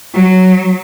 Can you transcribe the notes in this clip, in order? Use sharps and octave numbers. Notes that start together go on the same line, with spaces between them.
F#3